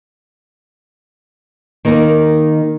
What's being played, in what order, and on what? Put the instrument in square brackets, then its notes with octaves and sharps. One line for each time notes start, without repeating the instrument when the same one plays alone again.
[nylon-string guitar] D#3 A#3 D#4 A#4